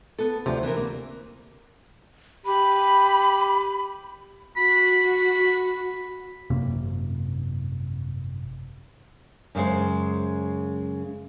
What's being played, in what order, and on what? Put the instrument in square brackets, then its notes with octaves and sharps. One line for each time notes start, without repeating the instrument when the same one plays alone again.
[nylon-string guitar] B3 A4
[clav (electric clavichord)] D2 C3 [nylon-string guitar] F3
[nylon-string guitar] E3 C4 A#4
A#3
[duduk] G4 [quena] B5
[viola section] F#4 [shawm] B5
[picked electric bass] G#1 F#2 C3 A#3
[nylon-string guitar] F#2 C#3 G#3 C5